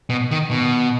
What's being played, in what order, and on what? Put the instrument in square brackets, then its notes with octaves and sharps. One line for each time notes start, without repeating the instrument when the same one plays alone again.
[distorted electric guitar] B2
D#3
B2